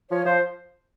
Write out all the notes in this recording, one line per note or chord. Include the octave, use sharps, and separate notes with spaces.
F3 C#5
F3 C5